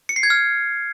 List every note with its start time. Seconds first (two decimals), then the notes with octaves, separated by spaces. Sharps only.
0.09 C#7
0.16 C7
0.23 G#6
0.30 F6